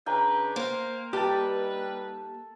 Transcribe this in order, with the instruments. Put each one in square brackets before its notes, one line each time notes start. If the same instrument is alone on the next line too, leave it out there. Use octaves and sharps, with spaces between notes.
[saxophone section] C#3 D4 B4 [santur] G5 G#5 A#5
[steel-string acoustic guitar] A#3 [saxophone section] C5
[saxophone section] G3 D#4 B4 [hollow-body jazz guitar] G4 [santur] A4 A5